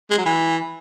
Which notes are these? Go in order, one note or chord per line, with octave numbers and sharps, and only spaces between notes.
G#3
F#3
E3